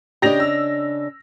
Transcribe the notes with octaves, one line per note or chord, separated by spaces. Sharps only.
C#3 D4 G4 D#5 A#6 F7
E6